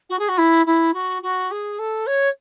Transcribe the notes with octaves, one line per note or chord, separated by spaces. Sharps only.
F#4
G#4
F#4
E4
E4
F#4
F#4
G#4
A4
C#5